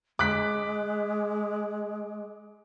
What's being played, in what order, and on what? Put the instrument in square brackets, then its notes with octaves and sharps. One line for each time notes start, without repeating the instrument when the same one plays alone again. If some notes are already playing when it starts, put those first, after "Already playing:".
[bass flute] G#3 [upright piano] D6 F#6 B6